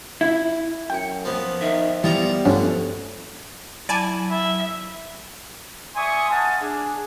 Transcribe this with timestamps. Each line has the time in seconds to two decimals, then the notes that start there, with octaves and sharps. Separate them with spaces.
0.21 E4
0.90 F#2 G5 C#7
1.25 F3 A#3 B3
1.61 D#3 E5
2.04 E3 G3 B3 F4 A5 A#5
2.45 D2 G2 D3 F3 C#4
3.89 F#3 E4 D5 G#5 A5
4.30 E4 E5
5.96 D5 E5 G#5 C6 C#6 D#6
6.30 F5 F#5 G#5 A5
6.62 D4 G#4